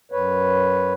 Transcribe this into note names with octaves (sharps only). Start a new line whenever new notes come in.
F#2 B4 C#5